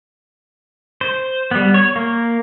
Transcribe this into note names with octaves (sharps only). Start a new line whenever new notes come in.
C5
G3 B3
C#5
A#3